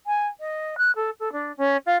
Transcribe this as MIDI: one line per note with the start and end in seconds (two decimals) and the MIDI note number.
0.07 0.27 80
0.40 0.75 75
0.78 0.91 90
0.96 1.10 69
1.20 1.32 69
1.32 1.55 62
1.57 1.77 61
1.86 1.97 65